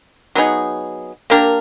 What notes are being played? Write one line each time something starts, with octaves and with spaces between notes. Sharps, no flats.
F#3 B3 D#4 G#4
A#3 D4 G4 A#4